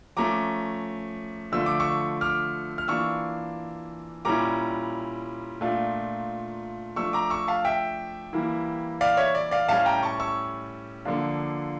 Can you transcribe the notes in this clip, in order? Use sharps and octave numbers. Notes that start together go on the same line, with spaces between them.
F3 A3 C#4 A#5 D6
D3 F3 A3 D4 F4 E6
D6
C#6 E6
D6 F6
F6
E3 A#3 D4 F4 C#6 E6
A#2 G3 C#4 E4 A#5 D6
A#2 A3 D4 F4
F3 A3 D4 C#6 E6
A#5 D6
C#6 E6
F5 A5
E5 G5
E3 G3 A#3 E4
D5 F5
C#5 E5
D5
D5 F5
A2 G3 C#4 F5 A5
G5 A#5
A5 C#6
C#6 E6
D3 F3 A#3 D4 F4